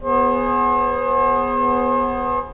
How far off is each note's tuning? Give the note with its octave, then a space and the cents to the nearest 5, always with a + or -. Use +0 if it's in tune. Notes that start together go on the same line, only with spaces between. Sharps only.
B3 +5 G#4 +0 C5 +40